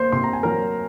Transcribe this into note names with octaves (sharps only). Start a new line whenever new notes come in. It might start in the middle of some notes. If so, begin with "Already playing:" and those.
Already playing: A#3 C5 C6
C3 C6
A#5
G#5
F#3 A#4 A#5